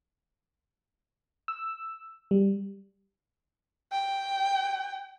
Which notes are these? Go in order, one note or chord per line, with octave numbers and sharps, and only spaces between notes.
E6
G3
G5